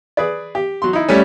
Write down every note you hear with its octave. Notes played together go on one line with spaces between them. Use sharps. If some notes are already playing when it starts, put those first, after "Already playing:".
G#4 B4 D5
G4
F#3 C6
D#4 E4
G3 A3 C#4